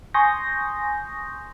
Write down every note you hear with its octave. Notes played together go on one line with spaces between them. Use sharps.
G#5 C6 C#6 D#6 G6 A#6